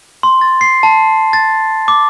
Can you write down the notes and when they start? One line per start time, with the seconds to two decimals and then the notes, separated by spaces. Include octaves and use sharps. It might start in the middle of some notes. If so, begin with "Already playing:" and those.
0.23 C6
0.41 A6
0.61 C7
0.83 A5
1.33 A6
1.88 D6